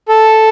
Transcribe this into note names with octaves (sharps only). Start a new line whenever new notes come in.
A4